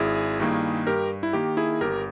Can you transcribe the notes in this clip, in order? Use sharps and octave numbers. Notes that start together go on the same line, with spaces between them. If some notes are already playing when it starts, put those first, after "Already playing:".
Already playing: G#1 E4 G#4
G2 D#3 A#3
G2 G4 A#4
E4
D#3 A#3 G4
E4 G#4
G1 G4 A#4